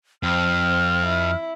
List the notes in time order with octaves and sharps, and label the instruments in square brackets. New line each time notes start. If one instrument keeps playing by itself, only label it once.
[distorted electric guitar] F2 [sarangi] C4 [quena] F6
[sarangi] E4